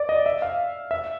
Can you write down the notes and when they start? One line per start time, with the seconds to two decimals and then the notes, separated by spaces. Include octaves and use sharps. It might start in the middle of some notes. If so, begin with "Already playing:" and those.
Already playing: D5
0.09 D#5
0.26 E5
0.42 F5
0.91 E5